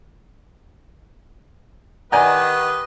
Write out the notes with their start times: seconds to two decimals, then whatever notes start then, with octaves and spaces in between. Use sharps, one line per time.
2.12 D#3 G4 B4 D5 D#5 F#5 G#5 A#5